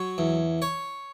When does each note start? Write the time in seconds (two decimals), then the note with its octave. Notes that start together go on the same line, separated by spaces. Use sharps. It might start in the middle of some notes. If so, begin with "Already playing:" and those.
Already playing: F#3 C#5
0.18 E2
0.62 C#5